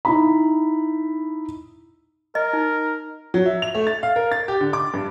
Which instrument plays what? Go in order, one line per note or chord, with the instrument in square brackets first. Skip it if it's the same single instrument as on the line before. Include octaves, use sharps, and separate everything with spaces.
[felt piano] D#4 E4 B5
[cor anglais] A#4 [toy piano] D#5
[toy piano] D#4
[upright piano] F#3
E5
F7
A3
A6
F5
A#4
A6
G4
D3
D6
G2